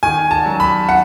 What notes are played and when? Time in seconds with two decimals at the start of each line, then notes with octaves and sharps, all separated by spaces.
0.03 D#3 G#5
0.31 A5
0.46 F#3
0.60 B5
0.89 F#5